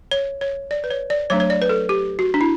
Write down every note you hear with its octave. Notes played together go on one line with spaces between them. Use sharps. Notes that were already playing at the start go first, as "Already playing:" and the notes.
C#5
C#5
D5
B4
C#5
D5
F#3 A3 D4 C#5
C#5
D5
B4
A4
G4
F#4
D4
E4